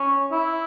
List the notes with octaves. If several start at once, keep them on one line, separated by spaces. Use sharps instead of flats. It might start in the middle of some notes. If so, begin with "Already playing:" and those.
Already playing: C#4
E4